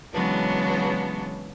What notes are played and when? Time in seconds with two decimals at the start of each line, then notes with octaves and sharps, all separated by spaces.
0.13 C#3 E3 F#3 G#3 B3 D4